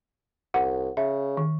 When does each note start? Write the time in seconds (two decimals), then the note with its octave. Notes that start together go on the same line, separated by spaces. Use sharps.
0.54 C2 F#5
0.97 C#3 E5
1.37 D#3